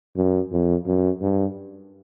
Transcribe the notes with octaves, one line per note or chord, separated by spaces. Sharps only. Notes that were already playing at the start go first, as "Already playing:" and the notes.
F#2
F2
F#2
G2